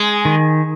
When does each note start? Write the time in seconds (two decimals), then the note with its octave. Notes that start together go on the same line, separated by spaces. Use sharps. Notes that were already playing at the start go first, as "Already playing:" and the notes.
Already playing: G#3
0.25 D#3